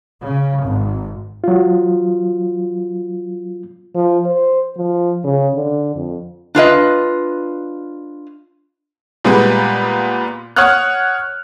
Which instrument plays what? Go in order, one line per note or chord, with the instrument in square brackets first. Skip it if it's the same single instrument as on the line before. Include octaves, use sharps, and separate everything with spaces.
[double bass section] C#3
G#1
[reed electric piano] F#3 F4
[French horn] F3
C5
F3
C#3
D3
F2
[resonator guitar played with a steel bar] D4 F4 B4 D#5
[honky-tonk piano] A#2 G3 G#3 B3
C#5 F#5 D#6 F6 F#6